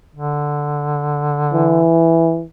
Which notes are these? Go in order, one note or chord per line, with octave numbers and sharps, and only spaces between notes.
D3
E3